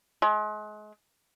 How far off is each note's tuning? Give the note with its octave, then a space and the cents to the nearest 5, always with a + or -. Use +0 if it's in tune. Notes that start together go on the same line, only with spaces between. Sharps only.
G#3 +35